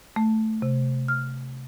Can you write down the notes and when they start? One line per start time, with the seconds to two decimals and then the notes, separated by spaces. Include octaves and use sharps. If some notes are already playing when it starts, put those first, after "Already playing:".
0.16 A3
0.62 C3
1.08 F6